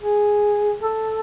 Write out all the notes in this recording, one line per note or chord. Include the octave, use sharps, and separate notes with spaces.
G#4
A4